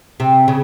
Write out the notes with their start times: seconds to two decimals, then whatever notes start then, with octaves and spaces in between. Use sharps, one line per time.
0.20 C3
0.48 C#3